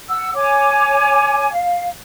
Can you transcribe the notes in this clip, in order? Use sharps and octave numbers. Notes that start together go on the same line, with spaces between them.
F#5 E6
C#5 G#5 D6
F5